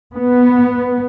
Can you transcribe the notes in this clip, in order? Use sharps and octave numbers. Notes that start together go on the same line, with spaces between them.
B3